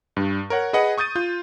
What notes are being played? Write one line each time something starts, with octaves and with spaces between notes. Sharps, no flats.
G2
A#4 C#5 F#5
G#4 B4 D#5 F#5
C#6 D#6 G6 A6 D#7
F4 G6